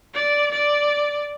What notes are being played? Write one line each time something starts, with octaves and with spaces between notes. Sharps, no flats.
D5
D5